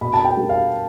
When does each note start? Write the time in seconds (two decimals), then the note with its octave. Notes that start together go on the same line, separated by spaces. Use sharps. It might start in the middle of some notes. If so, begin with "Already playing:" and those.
0.01 B2 B5
0.14 A5
0.25 G5
0.37 G3
0.49 F5